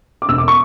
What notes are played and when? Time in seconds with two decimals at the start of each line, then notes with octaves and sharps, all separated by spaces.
0.22 D6
0.28 E1 E6
0.38 D6
0.48 C#6